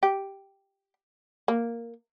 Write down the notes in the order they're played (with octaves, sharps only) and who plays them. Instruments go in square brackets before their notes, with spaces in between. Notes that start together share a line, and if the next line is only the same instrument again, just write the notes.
[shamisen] G4
A#3